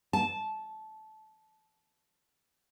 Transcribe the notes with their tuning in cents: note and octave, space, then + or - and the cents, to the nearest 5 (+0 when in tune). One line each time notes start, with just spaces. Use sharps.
A5 -15